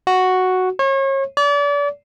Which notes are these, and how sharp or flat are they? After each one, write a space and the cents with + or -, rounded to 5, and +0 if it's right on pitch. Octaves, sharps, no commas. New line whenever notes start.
F#4 +0
C#5 -35
D5 -35